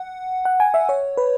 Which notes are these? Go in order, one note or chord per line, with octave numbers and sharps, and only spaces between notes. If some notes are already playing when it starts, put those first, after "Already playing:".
Already playing: F#5
F#5
G#5
E5
C#5
B4